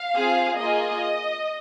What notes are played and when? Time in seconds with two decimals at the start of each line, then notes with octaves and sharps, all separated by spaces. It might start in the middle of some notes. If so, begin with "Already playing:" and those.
Already playing: F5
0.13 C4 F4 G#4
0.58 A#3 F4 G#4 D#5